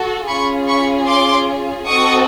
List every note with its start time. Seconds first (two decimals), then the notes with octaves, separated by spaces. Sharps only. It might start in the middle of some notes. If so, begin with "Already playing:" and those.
Already playing: F#4 A4
0.28 C#4 F4 G#4 B5 C#6
0.68 B5 C#6
1.08 C6 D6
1.87 C4 D#4 F#4 A4 C#6 D#6